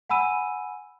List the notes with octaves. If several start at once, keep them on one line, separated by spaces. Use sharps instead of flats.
F#5 G#5 B5 E6 D#7